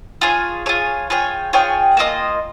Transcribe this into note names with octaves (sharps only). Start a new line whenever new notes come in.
F4 G#4 C#5
F4 G#4 C#5
F4 G#4 C#5 G5
F4 G#4 C#5 G5
A#3 F4 C5 D#5